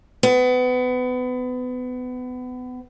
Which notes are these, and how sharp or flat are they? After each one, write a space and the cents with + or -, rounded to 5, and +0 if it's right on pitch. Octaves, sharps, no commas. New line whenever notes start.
B3 +30